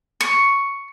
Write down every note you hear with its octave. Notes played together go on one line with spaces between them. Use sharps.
C#6